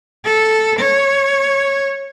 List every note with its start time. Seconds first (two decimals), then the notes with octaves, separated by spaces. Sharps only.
0.25 A4
0.79 C#5